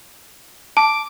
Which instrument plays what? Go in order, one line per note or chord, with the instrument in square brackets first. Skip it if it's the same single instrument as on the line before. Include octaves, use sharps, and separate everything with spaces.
[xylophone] A5 [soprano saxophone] D6